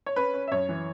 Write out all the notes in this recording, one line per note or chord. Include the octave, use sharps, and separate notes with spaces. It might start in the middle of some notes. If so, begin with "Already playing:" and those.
C#5
C#4 B4
C#4
E5
F#2 C#5
E3